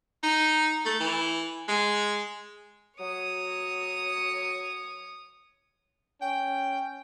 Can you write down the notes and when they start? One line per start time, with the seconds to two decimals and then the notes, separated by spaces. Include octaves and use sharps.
0.23 D#4
0.85 A3
1.00 E3
1.68 G#3
3.00 F#3 C#5 D#6
6.22 C#4 G5